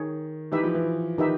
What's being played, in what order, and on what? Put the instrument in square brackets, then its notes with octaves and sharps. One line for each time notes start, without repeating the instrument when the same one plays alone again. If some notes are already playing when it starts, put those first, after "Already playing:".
Already playing: [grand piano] D#3 [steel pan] D#4 G#4 C#5
[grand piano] E3 [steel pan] D#4 G4 B4 E5
[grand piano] F3
E3
[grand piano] D#3 [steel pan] D#4 G4 B4 E5